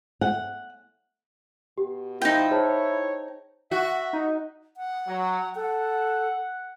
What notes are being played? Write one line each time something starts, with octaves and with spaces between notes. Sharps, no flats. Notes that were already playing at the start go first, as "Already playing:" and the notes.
F#5
B2 G4
F3 D#4 E4 G5
G#4 C5 C#5 A5
F#4 E5
D#4
F#5
F#3
A4 F#5